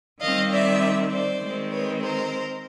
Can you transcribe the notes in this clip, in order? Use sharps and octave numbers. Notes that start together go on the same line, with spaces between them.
D#3 G3 C4 D#5 F5
D5 E5
C5 D5
D#3 G#3 C4
B4 C#5
A#4 C5